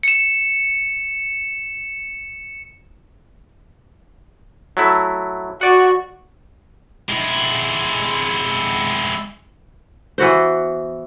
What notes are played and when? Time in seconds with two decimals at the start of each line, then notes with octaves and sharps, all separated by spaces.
0.03 C#7 E7
4.77 F#3 A3 E4
5.61 F#4 D5 F#5
7.09 G#3 E4
10.18 E3 B3 F#4 C5